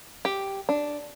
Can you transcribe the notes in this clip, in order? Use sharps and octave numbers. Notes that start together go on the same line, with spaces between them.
G4
D4